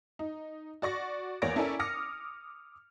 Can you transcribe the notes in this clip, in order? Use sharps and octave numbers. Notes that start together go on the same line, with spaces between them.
D#4
F#4 D5 C#6 A#6
E2 A#3 C#5 D5 A#6 D7
C#4 E4 A4 A#4 D5 G#5
D6 D#6 F6 A#6 C#7